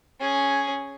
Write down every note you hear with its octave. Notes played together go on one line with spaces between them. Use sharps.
C#4 G#4